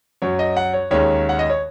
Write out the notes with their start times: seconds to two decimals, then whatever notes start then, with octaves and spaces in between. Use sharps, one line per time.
0.22 F#2 F#3 C#4 C#5
0.39 D#5
0.57 F#5
0.74 C#5
0.91 D#2 D#3 G#3 C#4 C#5
1.29 F#5
1.39 D#5
1.50 C#5